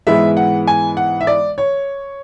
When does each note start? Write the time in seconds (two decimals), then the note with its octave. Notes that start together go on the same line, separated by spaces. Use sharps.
0.07 G#2 E3 G#3 B3 E5
0.37 F#5
0.68 G#5
0.97 F#5
1.21 E5
1.27 D5
1.58 C#5